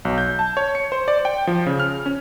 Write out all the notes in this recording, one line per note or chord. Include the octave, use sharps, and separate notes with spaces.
B1
G6
A5
C#5
C#7
C5
D5
G5
F3
C#3
F6
C#4